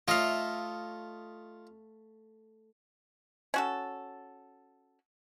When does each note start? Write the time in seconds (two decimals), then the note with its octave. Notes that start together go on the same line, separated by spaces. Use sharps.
0.08 A3 F4 C#5 D#5 F5
3.54 C#4 F#4 A4